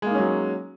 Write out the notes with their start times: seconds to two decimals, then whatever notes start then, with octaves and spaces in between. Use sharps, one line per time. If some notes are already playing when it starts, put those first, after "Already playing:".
0.02 G#3
0.06 A#3
0.11 D#4
0.15 C#4
0.19 F#3